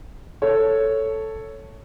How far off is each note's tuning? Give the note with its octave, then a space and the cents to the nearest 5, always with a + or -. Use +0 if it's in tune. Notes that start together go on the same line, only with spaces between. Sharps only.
A4 +0 C#5 +0